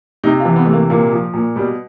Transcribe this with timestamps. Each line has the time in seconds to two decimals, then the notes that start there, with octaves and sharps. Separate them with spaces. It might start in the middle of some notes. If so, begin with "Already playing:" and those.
0.24 C3 D#4
0.40 F4
0.45 E3
0.56 B3
0.65 C3 A3
0.73 A#3
0.90 A#2 A#3
1.12 F3
1.34 A#2
1.56 B2 G3